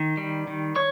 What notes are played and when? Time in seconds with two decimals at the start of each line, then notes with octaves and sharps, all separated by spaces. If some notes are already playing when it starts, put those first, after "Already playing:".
Already playing: D#3
0.17 G3
0.47 D#3
0.76 C#5 C#6